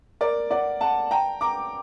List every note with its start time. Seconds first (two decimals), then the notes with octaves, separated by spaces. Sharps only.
0.21 A#4 D5
0.51 D5 F#5
0.81 F#5 A5
1.11 G5 A#5
1.41 A#5 D6